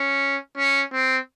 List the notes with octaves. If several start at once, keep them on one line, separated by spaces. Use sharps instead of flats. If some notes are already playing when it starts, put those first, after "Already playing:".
Already playing: C#4
C#4
C4